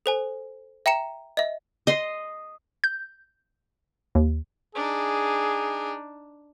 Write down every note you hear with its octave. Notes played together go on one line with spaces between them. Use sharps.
A4 C5 G#5
E5 G5 A#5 C#7 E7
D#5 E5
D#5 C6
G6
D#2
D4 D#4 G#4